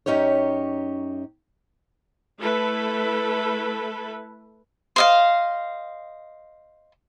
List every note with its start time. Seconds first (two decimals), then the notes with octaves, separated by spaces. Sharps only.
0.06 F#2 C#3 C#4 D#4 G4 C#5
2.39 A3 E4 A4 B4
4.96 C5 D#5 F5